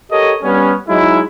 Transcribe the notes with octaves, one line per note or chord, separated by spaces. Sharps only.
G4 A4 A#4 C#5 D#5
G3 B3 C#4
F#3 G#3 D#4 E4